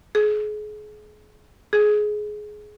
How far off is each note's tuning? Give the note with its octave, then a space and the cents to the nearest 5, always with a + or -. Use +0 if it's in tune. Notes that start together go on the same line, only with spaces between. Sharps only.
G#4 +35
G#4 +20